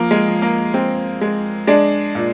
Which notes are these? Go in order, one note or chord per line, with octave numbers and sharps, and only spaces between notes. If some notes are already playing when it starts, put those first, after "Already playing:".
Already playing: F3 A#3
G#3
F3
A#3
G#3 C4
G#3
G#3 D4
A#2